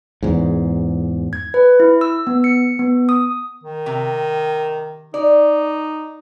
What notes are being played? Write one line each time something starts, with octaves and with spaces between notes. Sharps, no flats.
E2 G#2
G#6
B4
E4
E6
B3
C#7
B3
D#6
D#3
C3
D#4 D5